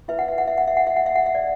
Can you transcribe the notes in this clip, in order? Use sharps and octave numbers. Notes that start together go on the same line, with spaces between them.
E4 B4 E5
F#5
E5
F#5
E5
F#5
E5
F#5
E5
F#5
E5
F#5
E5
D5